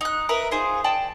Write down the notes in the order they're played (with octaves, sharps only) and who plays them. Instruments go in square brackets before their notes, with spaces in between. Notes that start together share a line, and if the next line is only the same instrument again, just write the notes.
[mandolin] D#4 F#6
A#4 B4 E5
D#4 F4 G#4 C5
D5 G5 A5